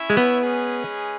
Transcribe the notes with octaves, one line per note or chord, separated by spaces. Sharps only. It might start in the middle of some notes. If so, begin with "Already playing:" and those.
Already playing: C#4 E4 C#5 E5
G#3
B3
G#3 C#4 G#4 B4